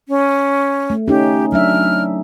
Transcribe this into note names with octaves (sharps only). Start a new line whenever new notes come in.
C#4
A3
C#4 D#4 G4
F#3 D4 E5 F6